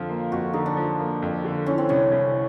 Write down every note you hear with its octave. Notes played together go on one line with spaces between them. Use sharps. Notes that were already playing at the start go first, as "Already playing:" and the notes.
Already playing: F2 D3 F3 F4
A#3
F2 F#4
D3 D#4
D4
F3
A#3
F2
D3
E3 C#4
C4
C2 C#4
C2